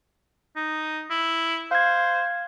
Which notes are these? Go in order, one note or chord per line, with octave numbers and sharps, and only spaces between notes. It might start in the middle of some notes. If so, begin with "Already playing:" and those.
D#4
E4
C5 F5 G#6